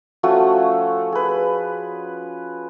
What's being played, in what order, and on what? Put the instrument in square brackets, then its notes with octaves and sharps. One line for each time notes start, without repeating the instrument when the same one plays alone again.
[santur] F3 A3 C#4 F#4
G#4 B4